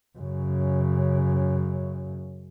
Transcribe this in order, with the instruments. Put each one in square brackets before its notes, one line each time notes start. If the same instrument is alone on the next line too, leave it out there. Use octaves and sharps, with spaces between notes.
[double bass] F#2 C#3